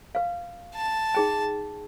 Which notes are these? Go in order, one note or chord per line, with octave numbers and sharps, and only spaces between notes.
B4 F5
A5
D#4 G#4 G5